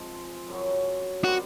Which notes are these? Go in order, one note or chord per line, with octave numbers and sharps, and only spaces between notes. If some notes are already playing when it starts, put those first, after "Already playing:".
Already playing: F3 G#3 C4
F#2 C#3 F#3
D#3 G3 C4 F#4